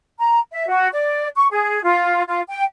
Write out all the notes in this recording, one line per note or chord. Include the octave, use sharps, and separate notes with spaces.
A#5
E5
F#4
D5
C#6
G#4
F4
F4
G5